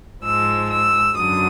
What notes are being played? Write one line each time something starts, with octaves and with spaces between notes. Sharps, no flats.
G#2 F3 G#3 E6
E6
F#2 D3 F#3 D#6